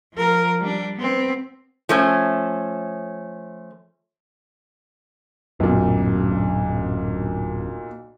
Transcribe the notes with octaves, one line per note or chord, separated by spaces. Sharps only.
F3 A#4
G3 D4
B3 C4
F3 A3 C#4
D1 B1 F#2 A#2